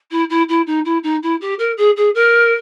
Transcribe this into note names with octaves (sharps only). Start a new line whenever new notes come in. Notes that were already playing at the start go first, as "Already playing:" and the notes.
E4
E4
E4
D#4
E4
D#4
E4
G4
A#4
G#4
G#4
A#4